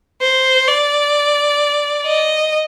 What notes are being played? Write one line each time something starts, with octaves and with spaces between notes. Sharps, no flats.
C5
D5
D#5